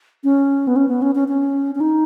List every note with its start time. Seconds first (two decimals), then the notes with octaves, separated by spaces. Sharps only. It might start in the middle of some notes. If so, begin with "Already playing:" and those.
0.24 C#4
0.67 B3
0.76 C#4
0.89 B3
1.02 C#4
1.15 C#4
1.28 C#4
1.75 C#4
1.80 D#4